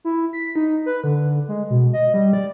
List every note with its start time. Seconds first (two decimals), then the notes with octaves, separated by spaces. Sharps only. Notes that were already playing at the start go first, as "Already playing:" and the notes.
0.04 E4
0.33 B6
0.56 D#4
0.86 B4
1.04 D3
1.48 G#3
1.70 B2
1.93 D#5
2.14 G3
2.33 D5